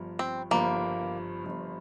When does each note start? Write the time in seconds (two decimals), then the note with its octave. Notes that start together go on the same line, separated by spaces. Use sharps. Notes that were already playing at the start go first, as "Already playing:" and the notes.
Already playing: G1 G2 F3
0.19 C4
0.51 G1 G2 F3 A#3
1.44 G1 G2 F3